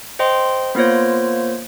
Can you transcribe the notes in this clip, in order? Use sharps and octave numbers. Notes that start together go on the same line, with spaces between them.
C5 D#5 G5 C6
A#3 B3 F4 C5 C#5